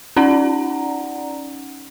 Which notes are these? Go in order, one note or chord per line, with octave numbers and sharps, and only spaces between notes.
C#4 D#4 D5 F#5 A#5